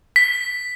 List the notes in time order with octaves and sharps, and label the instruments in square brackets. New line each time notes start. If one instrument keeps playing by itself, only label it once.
[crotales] B6